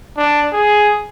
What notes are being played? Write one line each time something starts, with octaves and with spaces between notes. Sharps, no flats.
D4
G#4